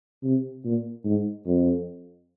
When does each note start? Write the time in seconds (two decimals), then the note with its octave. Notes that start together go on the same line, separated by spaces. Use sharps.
0.24 C3
0.65 A#2
1.05 G#2
1.47 F2